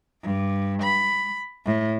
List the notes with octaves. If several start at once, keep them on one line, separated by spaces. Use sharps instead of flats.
G2
B5
A2